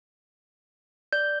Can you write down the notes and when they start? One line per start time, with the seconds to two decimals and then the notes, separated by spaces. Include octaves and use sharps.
1.13 D5 G6